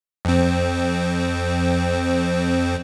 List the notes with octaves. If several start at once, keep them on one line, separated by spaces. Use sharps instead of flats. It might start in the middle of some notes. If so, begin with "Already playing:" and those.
F2 C4